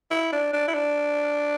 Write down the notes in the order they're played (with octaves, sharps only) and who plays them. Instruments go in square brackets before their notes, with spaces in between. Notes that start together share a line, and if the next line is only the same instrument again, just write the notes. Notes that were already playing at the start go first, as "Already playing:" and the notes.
[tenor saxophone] E4
D4
D4
E4
D4